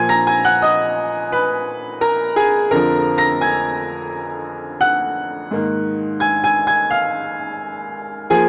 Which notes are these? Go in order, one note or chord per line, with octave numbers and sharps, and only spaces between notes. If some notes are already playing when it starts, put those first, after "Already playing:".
Already playing: A#2 F3 A#3 G#5 G#6
A#5 A#6
G#5 G#6
F#5 F#6
D#5 D#6
B4 B5
A#4 A#5
G#4 G#5
F2 D3 F3 A#4 A#5
A#5 A#6
G#5 G#6
F#5 F#6
G#2 D#3 A#3
G#5 G#6
G#5 G#6
G#5 G#6
F5 F6
F3 A#3 G#4 G#5